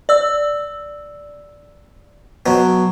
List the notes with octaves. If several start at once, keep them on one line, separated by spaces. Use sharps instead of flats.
D5 E6
B2 F#3